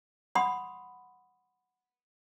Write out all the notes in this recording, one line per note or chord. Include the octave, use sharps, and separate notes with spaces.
F#5 B5 C6 D#6